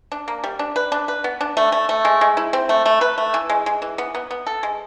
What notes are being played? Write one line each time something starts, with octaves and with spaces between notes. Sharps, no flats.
D4
A#3
G3
D4
B4
D4
B4
B3
D4
A3
A3
A3
G#3
G#3
E4
C4
A3
A3
B4
A3
E3
G#3
G#3
E3
B3
B3
B3
A4
G#3